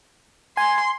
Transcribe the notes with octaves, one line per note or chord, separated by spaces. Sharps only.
G#5 C6